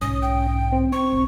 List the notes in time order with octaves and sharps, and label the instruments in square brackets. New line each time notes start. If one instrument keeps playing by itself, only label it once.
[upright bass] B1 G#2 [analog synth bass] C#4 [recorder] D#6
[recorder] G5
[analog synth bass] C4
[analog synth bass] C4 [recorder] C#6
[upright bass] B1 D3